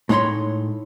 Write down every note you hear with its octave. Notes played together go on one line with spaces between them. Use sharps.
A2 G#3 D#4 C#5 B5 C6